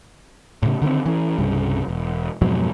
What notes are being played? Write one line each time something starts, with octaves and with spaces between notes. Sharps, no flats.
A2 C#3
D3 D#3 A3 C4
E3 C#4
C2 G2 C#3
E1
F2 G#2 B2 F#3